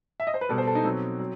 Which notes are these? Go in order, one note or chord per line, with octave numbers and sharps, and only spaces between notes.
E5
D#5
C5
B4
B2 G3 A4
C5
A4
D#4
B2 F#3 C4
F#3